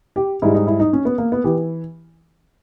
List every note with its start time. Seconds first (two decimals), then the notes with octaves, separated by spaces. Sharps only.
0.16 G4
0.42 G#2 G3 E4
0.55 D#4
0.67 E4
0.80 D#4
0.93 C#4
1.05 B3
1.18 A#3
1.32 B3
1.44 E3 G4